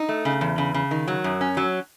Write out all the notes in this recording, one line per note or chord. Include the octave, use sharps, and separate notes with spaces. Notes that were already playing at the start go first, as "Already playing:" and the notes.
Already playing: D#4
A3
C#3
E2
C#3
C#3
D#3
F#3
F#2
C#4
F#3